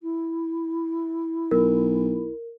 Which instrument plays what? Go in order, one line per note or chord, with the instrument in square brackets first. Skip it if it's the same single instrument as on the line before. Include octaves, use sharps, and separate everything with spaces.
[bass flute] E4
[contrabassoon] B1 [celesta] A#4